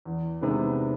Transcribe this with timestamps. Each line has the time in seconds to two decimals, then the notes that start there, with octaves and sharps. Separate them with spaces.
0.05 E2
0.41 C3 D#3 G#3 B3